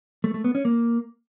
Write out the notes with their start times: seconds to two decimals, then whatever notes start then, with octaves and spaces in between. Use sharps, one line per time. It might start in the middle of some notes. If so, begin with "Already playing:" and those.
0.24 A3
0.34 A3
0.44 B3
0.55 C#4
0.65 A#3